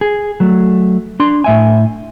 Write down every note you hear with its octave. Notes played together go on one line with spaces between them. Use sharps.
G#4
F#3 A3
D4 C6
A2 E5 G#5